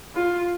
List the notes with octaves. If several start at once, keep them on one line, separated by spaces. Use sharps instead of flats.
F4